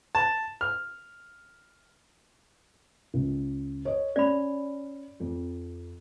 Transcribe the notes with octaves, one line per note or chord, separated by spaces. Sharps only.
A5
F6
C#2
C#5 D#5
C#4 D5 B5
F2